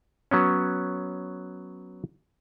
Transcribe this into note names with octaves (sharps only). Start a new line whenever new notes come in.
F#3 B3 C#4